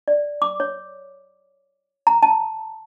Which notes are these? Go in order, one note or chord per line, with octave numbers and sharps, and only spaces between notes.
D5
D6
C#5
A#5
A5